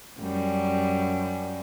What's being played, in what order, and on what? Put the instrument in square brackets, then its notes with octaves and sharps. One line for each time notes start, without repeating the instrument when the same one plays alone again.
[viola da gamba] F#2 G3